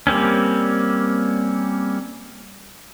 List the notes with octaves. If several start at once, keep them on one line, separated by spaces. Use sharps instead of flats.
G3 A#3 C4 C#4